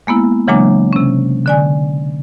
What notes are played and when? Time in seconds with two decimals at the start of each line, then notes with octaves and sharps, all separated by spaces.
0.07 G#3 A#3 B3 E4
0.48 C#3 E3 F#3 G#3 A#3 D4
0.93 C3 C#4
1.46 D3 D5 G#5